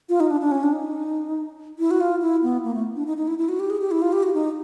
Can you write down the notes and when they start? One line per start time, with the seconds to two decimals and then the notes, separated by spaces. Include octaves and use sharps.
0.09 F4
0.20 D#4
0.31 D4
0.41 D4
0.51 C#4
0.63 D4
0.72 D#4
1.79 E4
1.91 F#4
2.00 F4
2.22 E4
2.43 B3
2.64 A#3
2.74 A3
2.96 D4
3.06 D#4
3.17 D#4
3.27 E4
3.38 E4
3.48 F#4
3.59 G4
3.70 G#4
3.81 G4
3.91 E4
4.02 F4
4.12 G4
4.23 F#4
4.34 D#4